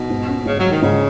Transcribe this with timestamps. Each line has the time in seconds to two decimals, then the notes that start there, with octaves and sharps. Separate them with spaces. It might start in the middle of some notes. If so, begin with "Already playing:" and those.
Already playing: B2 D#4
0.10 G#2
0.27 C#4
0.45 G#2 C#3
0.58 F#3
0.64 G#3
0.70 D#3
0.82 G#2 C#3